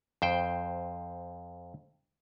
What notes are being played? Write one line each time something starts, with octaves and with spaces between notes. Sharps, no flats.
F2 C5 G5